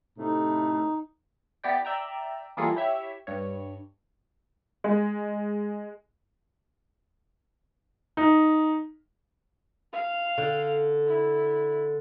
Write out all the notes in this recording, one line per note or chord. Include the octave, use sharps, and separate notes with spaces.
A2 C3 D#4
B3 E4 G4 D5 G5
D5 E5 G5 A#5
E3 G3 A#3 F4 G#4 A4
E4 G4 C#5 E5
G2 C#5
G#3
D#4
F5
D3
E4